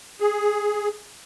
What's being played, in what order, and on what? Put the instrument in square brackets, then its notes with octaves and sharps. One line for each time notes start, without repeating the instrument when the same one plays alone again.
[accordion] G#4